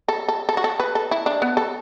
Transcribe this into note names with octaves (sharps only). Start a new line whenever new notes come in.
A4
A4
A4
F#4
A4
B4
A4
E4
D4
B3
A4